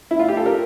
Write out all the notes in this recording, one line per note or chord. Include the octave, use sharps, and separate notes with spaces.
E4
F4
G4
A4
A#4